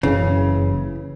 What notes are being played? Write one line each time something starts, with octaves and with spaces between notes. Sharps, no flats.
F#1 B1 C#3 E3